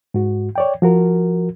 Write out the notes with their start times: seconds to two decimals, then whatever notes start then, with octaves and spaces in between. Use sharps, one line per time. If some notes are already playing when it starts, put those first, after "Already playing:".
0.14 G#2 F#4
0.56 C#5 D5 G5
0.82 F3 F#4 A#4